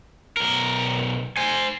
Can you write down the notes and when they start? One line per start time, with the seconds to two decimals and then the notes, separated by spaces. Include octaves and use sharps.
0.37 B1 A#4
1.37 C5 G#5